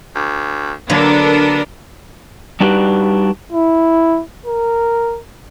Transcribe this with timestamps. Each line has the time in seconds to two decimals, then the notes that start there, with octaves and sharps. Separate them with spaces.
0.15 D2
0.90 D3 F#3 A#3 B3 D4 A4 A#4
2.60 G3 D4 D#4 F#4 G4 B4
3.52 E4
4.46 A#4